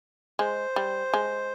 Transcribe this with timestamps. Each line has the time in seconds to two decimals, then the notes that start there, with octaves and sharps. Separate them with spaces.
0.39 G#3 C5
0.76 G3
1.14 G#3